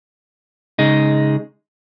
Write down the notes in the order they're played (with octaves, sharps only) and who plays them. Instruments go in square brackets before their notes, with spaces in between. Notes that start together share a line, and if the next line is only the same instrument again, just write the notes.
[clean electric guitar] C#3 G#3 D#4